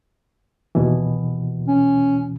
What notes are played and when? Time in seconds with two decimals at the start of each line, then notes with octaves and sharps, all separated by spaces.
0.75 D#2 B2 E3
1.68 C#4